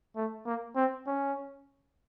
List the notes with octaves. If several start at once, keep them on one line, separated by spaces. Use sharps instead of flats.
A3
A#3
C4
C#4